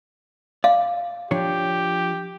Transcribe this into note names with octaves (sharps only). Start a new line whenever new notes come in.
D5 F5
F3 D4 G4 C#5